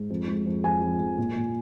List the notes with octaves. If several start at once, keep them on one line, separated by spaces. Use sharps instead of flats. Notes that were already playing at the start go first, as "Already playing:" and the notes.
Already playing: G#2
F2
G#3
F2
F2 G#5
F2
F2
A#2
A#2